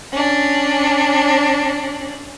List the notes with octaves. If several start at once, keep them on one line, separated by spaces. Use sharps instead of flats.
C#4 D4